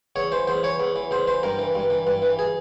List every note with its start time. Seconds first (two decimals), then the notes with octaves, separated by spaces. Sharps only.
0.16 E2 C#5
0.32 E3 C5
0.47 E2 C5
0.63 E3 C#5
0.80 E2
0.96 E3
1.11 E2 C5
1.27 E3 C5
1.43 G2 A#4
1.59 E3
1.75 G2
1.90 E3
2.07 G2
2.22 E3
2.39 G#4